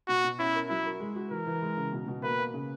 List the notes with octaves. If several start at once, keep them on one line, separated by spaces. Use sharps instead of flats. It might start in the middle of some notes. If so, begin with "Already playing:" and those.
B2 F#4
B2
C#4 E4
A#4
F#3 E4
A#4
G#3
F#4
E3 A#4
E3
G#3
C#3
B2
B2
A#3 B4
A#3
C#3